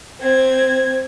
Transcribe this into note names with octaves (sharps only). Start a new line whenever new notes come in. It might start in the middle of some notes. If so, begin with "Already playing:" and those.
C4 G#6